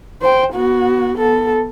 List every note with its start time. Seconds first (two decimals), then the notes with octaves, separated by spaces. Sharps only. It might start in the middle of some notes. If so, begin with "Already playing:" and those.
0.22 C5 G5
0.53 B3 F#4
1.18 B3 A4